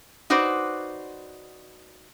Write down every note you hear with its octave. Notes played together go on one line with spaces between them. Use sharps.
D#4 F#4 B4 C5 D5